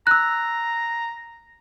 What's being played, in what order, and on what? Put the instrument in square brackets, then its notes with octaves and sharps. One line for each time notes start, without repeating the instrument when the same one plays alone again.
[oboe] A#5 [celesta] E6 F#6